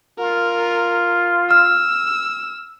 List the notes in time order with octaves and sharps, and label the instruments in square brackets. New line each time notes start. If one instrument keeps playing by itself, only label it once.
[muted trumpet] F4 [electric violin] A#4
[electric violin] E6 [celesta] F6